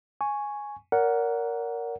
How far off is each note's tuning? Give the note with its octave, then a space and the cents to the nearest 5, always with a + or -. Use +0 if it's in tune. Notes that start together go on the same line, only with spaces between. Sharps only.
G#5 +0 C#6 +0
A#4 +0 D5 -40 F#5 +0